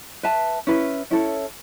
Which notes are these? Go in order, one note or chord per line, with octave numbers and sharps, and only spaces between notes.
B4 E5 A5
C#4 E4 B4
C#4 E4 A4 C#5